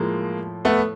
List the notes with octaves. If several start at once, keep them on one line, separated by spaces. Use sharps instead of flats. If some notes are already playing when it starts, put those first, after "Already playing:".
Already playing: A2 F3 G#3 A#3
A3 B3